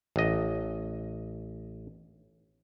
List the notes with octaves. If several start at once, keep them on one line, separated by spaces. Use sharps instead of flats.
A1 D#5